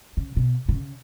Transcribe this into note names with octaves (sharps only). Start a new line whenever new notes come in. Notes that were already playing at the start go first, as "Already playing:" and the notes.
C#3
B2
B2
C#3